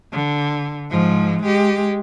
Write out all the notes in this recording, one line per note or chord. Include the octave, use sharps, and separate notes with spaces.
D3
G#2 F3
G#3 G4